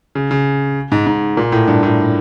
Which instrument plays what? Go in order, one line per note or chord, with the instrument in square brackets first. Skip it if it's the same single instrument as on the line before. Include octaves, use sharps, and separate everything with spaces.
[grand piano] C#3
C#3
G#2
G#2
A#2
A2
G2
A2